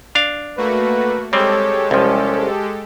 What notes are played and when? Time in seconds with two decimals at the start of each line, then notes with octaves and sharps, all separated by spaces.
0.15 D4 F5
0.58 A3 A#3 F#4 B4
1.33 G3 G#3 C4 G4 A4 C#5
1.91 C2 F3 C#4